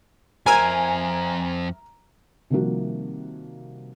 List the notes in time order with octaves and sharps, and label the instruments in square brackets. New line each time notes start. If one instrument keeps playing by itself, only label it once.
[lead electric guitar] F2 C5 [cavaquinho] A#4 E5 [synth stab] G#5 [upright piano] A#5
[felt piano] C3 D#3 F3 G3 A#3 F#4